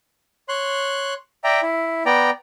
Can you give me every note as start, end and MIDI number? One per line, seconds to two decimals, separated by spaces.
0.49 1.14 73
0.49 1.14 84
0.49 1.14 90
1.44 1.61 74
1.44 1.61 76
1.44 1.61 79
1.44 1.61 82
1.62 2.03 64
2.06 2.30 59
2.06 2.30 74
2.06 2.30 79
2.06 2.30 82